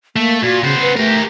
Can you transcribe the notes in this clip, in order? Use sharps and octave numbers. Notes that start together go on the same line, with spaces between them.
A3 A#3
A#2 F#4
C#3 B3 C5
B4
A3 G4 A#4